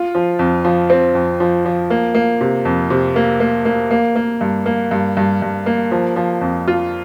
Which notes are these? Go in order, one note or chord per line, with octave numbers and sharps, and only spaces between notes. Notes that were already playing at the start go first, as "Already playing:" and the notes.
Already playing: F4
F3
F2
F3
C4
F2
F3
F3
A#3
A#3
C3
F2
C3
A#3
A#3
A#3
A#3
A#3
G2
A#3
G2
G2
G2
A#3
F3
F3
F2
F4